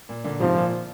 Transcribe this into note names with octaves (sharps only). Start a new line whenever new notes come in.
A#2
A#2 D3
G#2 C3 F3
A#2